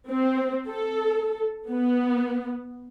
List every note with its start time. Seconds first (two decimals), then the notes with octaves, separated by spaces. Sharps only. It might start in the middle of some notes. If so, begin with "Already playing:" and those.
0.10 C4
0.68 A4
1.71 B3